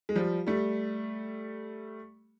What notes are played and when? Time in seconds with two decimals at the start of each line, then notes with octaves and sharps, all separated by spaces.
0.09 G#3
0.16 F3 G3
0.47 G3 A3